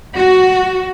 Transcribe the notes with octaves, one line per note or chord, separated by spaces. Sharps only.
F#4